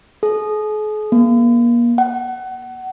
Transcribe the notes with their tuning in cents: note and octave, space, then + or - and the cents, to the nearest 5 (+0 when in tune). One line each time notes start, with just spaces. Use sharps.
G#4 +45
A#3 +35
F#5 +25